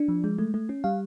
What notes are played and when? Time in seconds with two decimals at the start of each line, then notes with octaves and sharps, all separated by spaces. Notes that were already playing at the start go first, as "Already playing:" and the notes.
Already playing: D4
0.08 F3
0.24 G#3
0.39 A3
0.54 A3
0.69 C#4
0.84 G3 F5